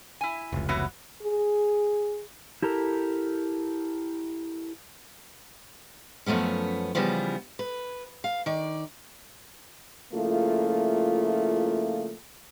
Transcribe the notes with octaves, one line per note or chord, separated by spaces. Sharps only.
E4 G#5
F1 C#2
E3 F#3 B3
G#4
E4 G4 A4 A#4
F#2 F3 A3 B3 C#4
C#3 E3 F3 G3 B3
B4
F5
D#3 D5
C#3 F3 A3 A#3 E4 F4